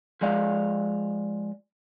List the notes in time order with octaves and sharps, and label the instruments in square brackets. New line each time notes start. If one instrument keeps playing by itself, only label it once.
[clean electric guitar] F3 G#3 D5 F5